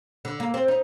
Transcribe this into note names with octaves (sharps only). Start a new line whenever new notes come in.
D3
A#3
C4
D#4